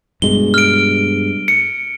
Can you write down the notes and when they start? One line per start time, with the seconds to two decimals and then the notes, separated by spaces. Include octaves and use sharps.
0.22 G2 B2 G#3 G7
0.54 F6 D7
1.48 C#7